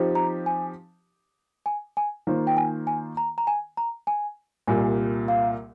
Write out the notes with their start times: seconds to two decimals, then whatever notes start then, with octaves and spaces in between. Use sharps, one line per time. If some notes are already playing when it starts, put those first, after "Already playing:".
Already playing: F3 C4 D#4 G4
0.15 A#5
0.46 G#5
1.66 G#5
1.97 G#5
2.27 D#3 A#3 F4 C5
2.47 G5
2.57 G#5
2.87 G#5
3.17 A#5
3.38 A#5
3.47 G#5
3.77 A#5
4.07 G#5
4.67 C2 A#2 G3 G#5
5.28 F5